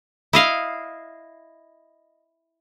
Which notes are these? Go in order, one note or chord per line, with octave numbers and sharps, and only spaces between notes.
E4 D#5 F5